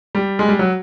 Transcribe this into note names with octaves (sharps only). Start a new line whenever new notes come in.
G3
G#3
G3
F#3